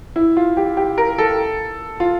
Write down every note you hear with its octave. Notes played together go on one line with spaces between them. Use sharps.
E4
F4
G4
G4
A#4
A4
F4